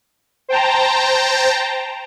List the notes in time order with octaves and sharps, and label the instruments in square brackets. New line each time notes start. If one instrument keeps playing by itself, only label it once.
[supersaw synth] C5 G5 A5 A#5